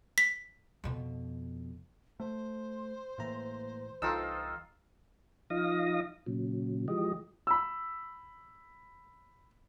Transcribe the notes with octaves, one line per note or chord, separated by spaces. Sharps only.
B6
F2 B2
A3 C5
A2 E3 A#3 A#5
C2 E3 D#4 F4 A4 F5 G5 E6
F3 D#4 F5 D#6 A#6
A#2 C#3 F#3
E3 F3 G#3 G4 D#5
B5 E6